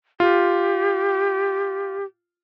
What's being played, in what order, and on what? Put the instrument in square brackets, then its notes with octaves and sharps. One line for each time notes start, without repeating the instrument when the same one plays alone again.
[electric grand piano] F4 [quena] G4